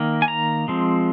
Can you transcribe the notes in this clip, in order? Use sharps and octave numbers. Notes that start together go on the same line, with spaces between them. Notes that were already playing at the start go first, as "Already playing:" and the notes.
Already playing: D#3 A#3
G#5
A#5
F3 G#3 C4